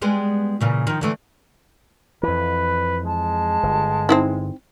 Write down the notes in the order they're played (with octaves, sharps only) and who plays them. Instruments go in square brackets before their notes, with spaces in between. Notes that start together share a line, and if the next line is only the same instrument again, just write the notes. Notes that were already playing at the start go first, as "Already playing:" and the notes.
[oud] G3 G#3 B3
A#2 C#3 E3
D#3 F3
D3 E3 A3
[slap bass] F2 E3 [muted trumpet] B4
[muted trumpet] G#3 [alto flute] A5
[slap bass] G1
[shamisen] C4 D#4 E4